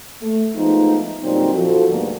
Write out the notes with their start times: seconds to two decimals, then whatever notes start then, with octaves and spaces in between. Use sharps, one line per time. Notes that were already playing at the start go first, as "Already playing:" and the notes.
0.21 A3
0.54 F3 G#3 A3 B3 D#4
1.23 A#2 D3 F#3 G3 C4 D#4
1.52 F3 F#4 A4
1.88 D2 G#2 D3 G3 A#3 B3